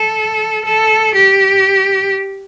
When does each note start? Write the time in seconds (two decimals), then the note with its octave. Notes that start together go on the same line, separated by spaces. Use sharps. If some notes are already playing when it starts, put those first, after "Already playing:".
Already playing: A4
0.66 A4
1.15 G4